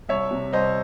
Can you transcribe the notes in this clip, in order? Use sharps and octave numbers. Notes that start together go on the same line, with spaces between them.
C2 C#5 E5
C3
C2 C5 D#5